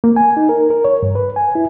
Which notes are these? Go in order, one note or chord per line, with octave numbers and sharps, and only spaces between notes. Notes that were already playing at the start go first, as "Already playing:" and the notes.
A#3
G#5
D#4
A#4
A#4
C#5
G2
B4
G#5
E4